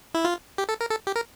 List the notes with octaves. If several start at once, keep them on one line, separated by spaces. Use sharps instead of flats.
E4
F4
G4
A4
A#4
A4
G4
A#4